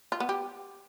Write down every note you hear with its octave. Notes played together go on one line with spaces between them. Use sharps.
F4
B3
G4